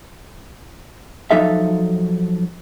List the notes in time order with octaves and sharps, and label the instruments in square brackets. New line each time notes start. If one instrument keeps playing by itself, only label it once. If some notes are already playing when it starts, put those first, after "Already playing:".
[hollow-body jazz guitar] F3 F#3 D#4 A4 E5 F5